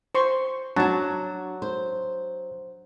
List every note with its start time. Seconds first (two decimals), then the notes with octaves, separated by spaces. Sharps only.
0.15 C5 C6 C#6
0.76 F#3 D4 F#4 A5
1.62 C5